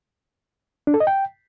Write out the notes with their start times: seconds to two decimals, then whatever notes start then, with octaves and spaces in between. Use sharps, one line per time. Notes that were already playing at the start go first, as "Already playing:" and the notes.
0.87 D4
0.94 A4
1.00 D#5
1.07 G5